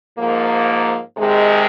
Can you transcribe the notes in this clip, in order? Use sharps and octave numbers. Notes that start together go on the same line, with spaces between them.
G#2 F3 A#3
C3 D#3 G#3